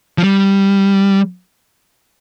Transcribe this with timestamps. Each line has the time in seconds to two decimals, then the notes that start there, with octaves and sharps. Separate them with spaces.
0.18 F3
0.24 G3